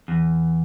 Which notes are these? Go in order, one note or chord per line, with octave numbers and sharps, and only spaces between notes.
E2